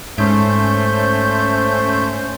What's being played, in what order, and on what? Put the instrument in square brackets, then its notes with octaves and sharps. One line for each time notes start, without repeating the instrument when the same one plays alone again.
[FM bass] G#2 [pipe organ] A3 G6 [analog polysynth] C#4 C5